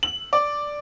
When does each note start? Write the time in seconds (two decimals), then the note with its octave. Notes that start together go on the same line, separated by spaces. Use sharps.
0.03 F#7
0.33 D5